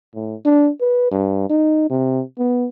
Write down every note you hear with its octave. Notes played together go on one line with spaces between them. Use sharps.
A2
D4
B4
G2
D#4
C3
B3